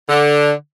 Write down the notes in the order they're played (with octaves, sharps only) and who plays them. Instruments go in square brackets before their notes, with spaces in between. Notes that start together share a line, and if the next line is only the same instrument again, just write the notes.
[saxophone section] D3